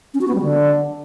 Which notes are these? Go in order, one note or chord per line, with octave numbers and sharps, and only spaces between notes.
C#4
F#4
B3
G3
D3